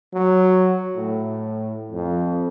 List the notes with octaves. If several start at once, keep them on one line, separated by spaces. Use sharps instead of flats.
F#3
A2
F2